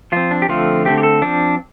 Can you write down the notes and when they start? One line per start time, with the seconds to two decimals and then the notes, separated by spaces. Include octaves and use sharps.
0.12 F3 C4 F4
0.31 D4
0.42 G4
0.49 D3 F3 A3 C4 F4
0.85 D3 A3 C4 G4
0.98 G4
1.03 A4
1.22 F3 C4 D4